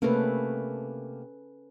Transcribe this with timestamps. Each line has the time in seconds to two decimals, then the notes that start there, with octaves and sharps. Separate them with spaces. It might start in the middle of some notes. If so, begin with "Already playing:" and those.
0.02 C3 A3 A#3 C#4 A4 B4